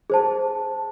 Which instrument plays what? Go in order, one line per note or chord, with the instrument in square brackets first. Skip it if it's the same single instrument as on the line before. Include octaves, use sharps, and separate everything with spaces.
[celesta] G#4 C5 A5